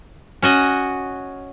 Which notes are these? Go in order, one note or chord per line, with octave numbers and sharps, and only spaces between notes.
C#4 F#4 D#5